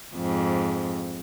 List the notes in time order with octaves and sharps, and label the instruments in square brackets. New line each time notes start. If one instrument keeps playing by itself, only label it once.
[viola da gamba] F2 G#2